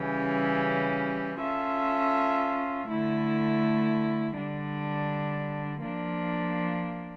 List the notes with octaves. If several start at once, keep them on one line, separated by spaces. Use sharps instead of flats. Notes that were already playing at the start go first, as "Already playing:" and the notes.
Already playing: C#3 E3 G3 C#4 G4
C#4 F4 A4 E5
D3 A3 E4
D3 G3 D4
F3 A#3 D4